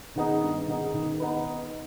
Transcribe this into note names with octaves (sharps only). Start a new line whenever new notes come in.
D#3 B3 D#4 G#4
G2
D#3 B3 D#4 G#4
D#3
B3 D#4 B4